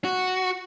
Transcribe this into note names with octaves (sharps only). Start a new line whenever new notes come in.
F#4